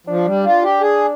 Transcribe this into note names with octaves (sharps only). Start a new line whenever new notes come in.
F3 D4
G3
F4
G4
G#4